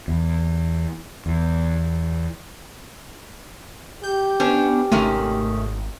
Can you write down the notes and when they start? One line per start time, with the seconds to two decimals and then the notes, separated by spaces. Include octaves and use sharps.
0.08 E2
1.26 E2
4.04 G4 G6
4.40 B3 C#4 D4 C5
4.92 G#1 C3 D#3 A3 C#4